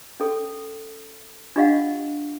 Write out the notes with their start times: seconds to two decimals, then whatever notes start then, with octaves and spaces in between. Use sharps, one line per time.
0.20 C#4 A4
1.56 D4 F4 G4 D#5 F5 F#5